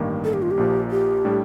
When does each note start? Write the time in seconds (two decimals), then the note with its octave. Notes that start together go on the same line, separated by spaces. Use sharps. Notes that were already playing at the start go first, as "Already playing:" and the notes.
Already playing: A1 G2 D#3 A#3
0.24 A4
0.34 G4
0.42 F4
0.51 G4
0.57 A#1 A#2 F3
0.91 G4
1.25 A2 G3 D4